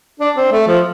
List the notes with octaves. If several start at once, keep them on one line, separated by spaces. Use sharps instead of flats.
D4
C4
A3
F3